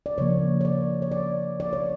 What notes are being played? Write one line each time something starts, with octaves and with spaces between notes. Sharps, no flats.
D5
C#3 F3 A#3 C#5
C#5
D5
C#5
D5
D5
C#5